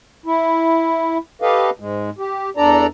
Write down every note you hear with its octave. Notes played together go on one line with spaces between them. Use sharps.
E4
G4 A4 B4 D#5 F5
G#2 G#3
G4
E2 D4 A4 D5 A#5